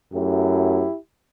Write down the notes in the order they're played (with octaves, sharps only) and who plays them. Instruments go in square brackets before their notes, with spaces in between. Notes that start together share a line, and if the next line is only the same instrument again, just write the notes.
[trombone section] F#2 F#3 A3 E4 G4